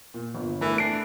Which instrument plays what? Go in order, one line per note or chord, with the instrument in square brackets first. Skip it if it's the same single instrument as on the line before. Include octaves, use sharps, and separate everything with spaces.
[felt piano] A#2
G1
[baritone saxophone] E3 [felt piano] A3 A#4 B5
[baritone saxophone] D4 [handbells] C7 D7